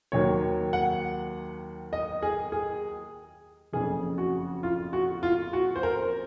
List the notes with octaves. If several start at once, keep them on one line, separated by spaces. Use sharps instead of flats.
D#2 D#3 F#3 A#3 C#5
F#5
D#5
G#4
G#4
F#1 F2 C#3 G#4
F#4
F4
F#4
F4
F#4
C5
A#4